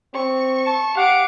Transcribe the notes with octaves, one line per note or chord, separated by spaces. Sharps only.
C4 C#6
A5
G4 F5 F#5 D7